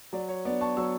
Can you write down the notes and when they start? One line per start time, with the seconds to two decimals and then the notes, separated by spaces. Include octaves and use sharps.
0.13 F#3 D5
0.29 C#5
0.45 B3 D5
0.49 D4
0.61 A5 C#6
0.77 F#3 C#6 E6